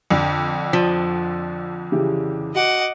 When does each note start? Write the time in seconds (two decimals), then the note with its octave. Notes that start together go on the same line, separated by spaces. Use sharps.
0.11 F2 D3
0.73 F3
1.92 C#3 E3 G4
2.55 F#4 D#5 F#5 D6